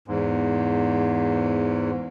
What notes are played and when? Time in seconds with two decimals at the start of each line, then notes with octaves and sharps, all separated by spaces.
0.08 E2 G#2